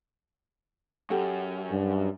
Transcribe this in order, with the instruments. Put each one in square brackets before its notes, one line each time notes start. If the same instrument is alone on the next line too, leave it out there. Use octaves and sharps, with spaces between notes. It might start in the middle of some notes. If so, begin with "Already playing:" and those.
[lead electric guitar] F#2 [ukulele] G4 A4 F#5
[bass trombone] G2